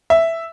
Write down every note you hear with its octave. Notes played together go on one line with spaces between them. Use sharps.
E5